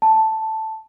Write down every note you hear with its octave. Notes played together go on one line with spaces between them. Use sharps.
A5